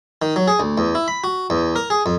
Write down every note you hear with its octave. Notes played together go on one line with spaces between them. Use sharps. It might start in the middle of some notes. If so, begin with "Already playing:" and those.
D#3
F#3
G#4
D2
E2
E4
B5
F#4
E2
A#4
G#4
F2